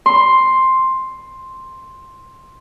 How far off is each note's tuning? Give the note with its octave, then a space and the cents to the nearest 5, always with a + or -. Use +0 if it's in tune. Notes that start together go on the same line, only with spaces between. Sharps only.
C6 +5